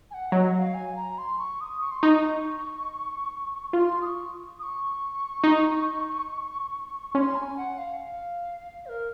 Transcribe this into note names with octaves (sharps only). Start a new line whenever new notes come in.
G#5
F#5
F#3 D#5
F#5
F5
G#5
A#5
C6
C#6
D#6
C#6
C6
D#4 C#6
F4 C6
D#6
C#6
D#6
C#6
D#4
C#4 C6
G#5
F#5
F5
F5
C5
A#4